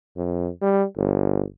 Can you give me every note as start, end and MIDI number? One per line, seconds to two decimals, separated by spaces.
0.17 0.50 41
0.62 0.84 55
0.97 1.44 31